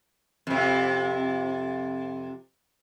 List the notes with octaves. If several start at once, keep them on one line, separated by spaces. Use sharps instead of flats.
F2 C3